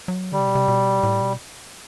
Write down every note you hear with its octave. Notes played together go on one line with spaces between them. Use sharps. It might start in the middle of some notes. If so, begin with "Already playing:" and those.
F#3
D3 G3
C3
B2
C3
B2
A2
B2